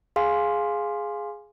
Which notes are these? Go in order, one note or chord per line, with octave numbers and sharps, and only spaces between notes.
G#4 F5 G#5 C6